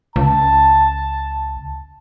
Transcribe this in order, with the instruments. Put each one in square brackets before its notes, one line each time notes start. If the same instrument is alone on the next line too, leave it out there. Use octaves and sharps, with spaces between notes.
[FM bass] C#2 [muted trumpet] A5